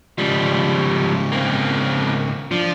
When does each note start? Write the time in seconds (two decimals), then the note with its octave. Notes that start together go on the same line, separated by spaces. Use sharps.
0.18 G#2 C#3 F3 G3
1.32 A#3 C4
2.51 F3 D4